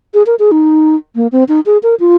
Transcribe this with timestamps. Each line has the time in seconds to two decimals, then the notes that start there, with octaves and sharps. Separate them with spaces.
0.14 G#4
0.26 A#4
0.39 G#4
0.52 D#4
1.16 A#3
1.32 C4
1.48 D#4
1.66 G#4
1.83 A#4
2.00 F4